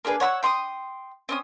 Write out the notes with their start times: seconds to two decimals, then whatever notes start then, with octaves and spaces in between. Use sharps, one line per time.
0.05 A#3 D4 G#4 B4
0.20 C#5 F#5 B5 E6
0.43 G5 C6 C#6 D#6
1.29 C4 C#4 D#6